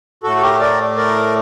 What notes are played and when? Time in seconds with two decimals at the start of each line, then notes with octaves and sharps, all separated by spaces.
0.23 A2 A3 F#4 A4
0.37 A4
0.42 G4 A#4
0.60 A#4 D5
0.96 A#4 D5